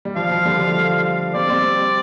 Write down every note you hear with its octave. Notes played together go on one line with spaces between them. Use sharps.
G3
F3 F5
F3
D3 G3
F3 A3
G3 C4 D5
G3 C4